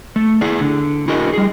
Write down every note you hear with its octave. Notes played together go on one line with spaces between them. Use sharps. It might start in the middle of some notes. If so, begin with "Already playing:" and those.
A3
E4 G#4 D5
D3
E4 F#4 G#4 A#4 D#5
G3 G#4